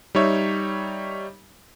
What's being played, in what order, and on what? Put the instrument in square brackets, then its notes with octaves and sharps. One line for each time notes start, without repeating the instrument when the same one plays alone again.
[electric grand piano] G3 D#4 C#5 E5